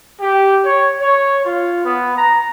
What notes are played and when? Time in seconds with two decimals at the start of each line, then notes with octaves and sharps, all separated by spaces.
0.21 G4
0.65 C#5
1.00 C#5
1.45 F4
1.85 B3
2.18 A#5